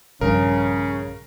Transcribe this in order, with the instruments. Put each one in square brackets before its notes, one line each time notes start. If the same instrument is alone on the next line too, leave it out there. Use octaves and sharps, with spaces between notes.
[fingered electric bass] A#1 G2 [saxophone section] C#3 [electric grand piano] A#4